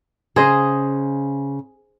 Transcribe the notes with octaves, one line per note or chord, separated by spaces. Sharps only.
C#3 G#4 C5 D#5